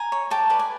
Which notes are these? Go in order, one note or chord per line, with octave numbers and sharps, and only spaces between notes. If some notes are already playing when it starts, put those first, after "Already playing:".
Already playing: G#5 A#5
C#5
G4 G5 A5
B4 D5
G#5